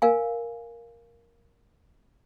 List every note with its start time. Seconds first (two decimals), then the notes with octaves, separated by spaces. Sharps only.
0.02 A#4 F5 G#5